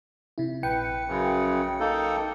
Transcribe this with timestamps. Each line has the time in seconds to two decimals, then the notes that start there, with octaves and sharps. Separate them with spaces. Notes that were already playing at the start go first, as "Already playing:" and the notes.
0.38 C3 E4
0.63 A#1 B4 G5 C#7
1.08 F#2 C#3
1.80 A#3 D#4 A4